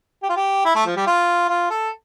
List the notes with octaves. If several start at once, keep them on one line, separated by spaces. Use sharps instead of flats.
G4
F4
G4
E4
A3
F3
G3
F4
F4
A4